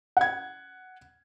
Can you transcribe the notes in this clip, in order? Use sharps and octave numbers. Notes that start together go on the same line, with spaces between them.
F#5 G#6